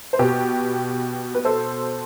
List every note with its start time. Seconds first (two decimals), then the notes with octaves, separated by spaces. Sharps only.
0.13 C5
0.19 B2 G4 B4
1.34 B4
1.45 A4 C5